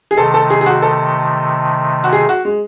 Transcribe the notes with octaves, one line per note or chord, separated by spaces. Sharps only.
G#4
C3 D#3 A3 A4
A4
G#4
G#4
F#4
A4
F#4
G#4
F#4
G#3